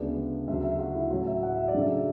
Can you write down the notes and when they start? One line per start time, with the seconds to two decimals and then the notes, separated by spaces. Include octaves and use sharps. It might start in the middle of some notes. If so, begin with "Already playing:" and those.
Already playing: D2 C#3 G#3 B3 D4
0.48 D2 C#3 F#3 E5
0.63 E5
0.79 F#4
0.95 E4
1.11 A2 F#3 C#4 F#4
1.27 E5
1.43 F#5
1.55 E5
1.68 D5
1.74 C#3 F#3 A3 D4
1.81 E5